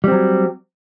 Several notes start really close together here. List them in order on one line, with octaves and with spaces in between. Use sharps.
G3 C4 F#3